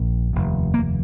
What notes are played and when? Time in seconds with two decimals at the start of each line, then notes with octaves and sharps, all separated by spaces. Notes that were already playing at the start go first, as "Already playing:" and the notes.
Already playing: A#1 A#2
0.33 F1 D#2
0.74 A#3